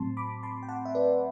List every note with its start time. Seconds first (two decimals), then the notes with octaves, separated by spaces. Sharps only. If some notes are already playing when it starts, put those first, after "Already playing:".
Already playing: A2 F#3 C4 A5 C6
0.17 B5 D6
0.43 A5 C6
0.63 G5
0.68 F#5 A5
0.85 E5
0.95 B4 D5